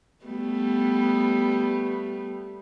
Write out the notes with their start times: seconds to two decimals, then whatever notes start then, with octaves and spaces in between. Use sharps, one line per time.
0.25 G3 A3 B3